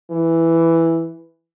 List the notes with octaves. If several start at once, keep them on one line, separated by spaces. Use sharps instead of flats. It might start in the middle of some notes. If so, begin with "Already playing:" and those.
E3